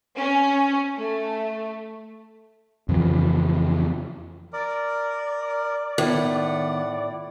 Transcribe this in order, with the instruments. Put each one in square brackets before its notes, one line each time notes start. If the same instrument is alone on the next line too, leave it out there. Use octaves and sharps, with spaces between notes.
[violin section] C#4
A3
[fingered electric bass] F2 C#3 E3 F3
[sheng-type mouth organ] A#4 [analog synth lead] D5
[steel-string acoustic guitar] A2 [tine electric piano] D#3 B3 [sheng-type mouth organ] F#5